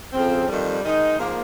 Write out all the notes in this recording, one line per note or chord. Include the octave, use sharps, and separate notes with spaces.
F2 C#3 F3 C4
F2 D#3 G3
D#3 G#3 D#4
G#2 F3 A#3